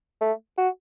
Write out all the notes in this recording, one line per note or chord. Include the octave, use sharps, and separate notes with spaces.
A3
F#4